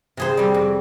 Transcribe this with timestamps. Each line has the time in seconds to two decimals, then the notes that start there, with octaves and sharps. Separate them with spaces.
0.17 C3 G#4 C5
0.37 G3 C4
0.54 F2